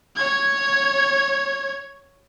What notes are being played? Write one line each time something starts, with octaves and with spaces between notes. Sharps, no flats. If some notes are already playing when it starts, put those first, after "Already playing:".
C#5 G#6